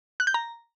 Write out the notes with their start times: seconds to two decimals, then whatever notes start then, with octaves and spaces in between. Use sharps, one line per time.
0.20 F#6
0.27 G6
0.34 A#5